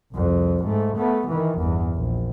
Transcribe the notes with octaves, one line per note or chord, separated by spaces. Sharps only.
C2 F2
G#2 A3
A3 B3
D#3 E3
G1 E2
A#1